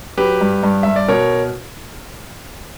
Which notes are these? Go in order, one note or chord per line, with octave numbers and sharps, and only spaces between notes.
F#3 G4 B4
G2
G2
G2 E5
D5
B2 A#4 C#5